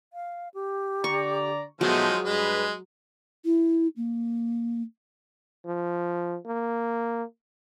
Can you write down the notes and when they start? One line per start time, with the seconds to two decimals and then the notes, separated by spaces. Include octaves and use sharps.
0.13 F5
0.54 G4
1.04 D3 D5 A#5 C#6
1.81 B2 D#3 F3 F#3 G#3 A3 G#4
2.24 G2 G#3 B4
3.45 E4
3.96 A#3
5.65 F3
6.46 A#3